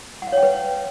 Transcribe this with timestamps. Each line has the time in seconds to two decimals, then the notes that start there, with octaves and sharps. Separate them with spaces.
0.22 F#5
0.27 F5
0.32 C#5
0.38 G5
0.43 B4